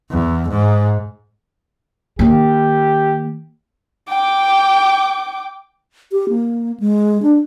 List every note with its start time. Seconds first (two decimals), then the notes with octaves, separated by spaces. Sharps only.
0.11 E2
0.49 G#2
2.19 D#3 A#3 G4
4.09 G5 D6
6.12 G4
6.29 A#3
6.80 G#3
7.23 D4